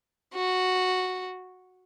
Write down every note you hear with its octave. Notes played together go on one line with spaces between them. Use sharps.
F#4